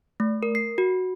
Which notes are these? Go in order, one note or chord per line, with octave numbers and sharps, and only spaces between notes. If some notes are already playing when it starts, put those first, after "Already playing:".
A3
A#4
C7
F#4